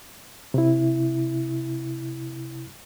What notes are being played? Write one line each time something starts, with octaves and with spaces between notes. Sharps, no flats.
C3 E4